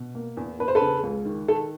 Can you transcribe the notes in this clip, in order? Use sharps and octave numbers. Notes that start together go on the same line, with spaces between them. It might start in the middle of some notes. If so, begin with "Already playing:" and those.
Already playing: B2
A#3
E2
E2 B4
C5
A4 B4
C#3
C#2
D#3
D#3 A4